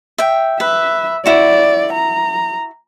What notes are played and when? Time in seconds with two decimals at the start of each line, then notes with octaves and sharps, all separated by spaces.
0.18 E5 G5
0.60 B4 E5
1.26 E4 F#4 D5
1.93 A#5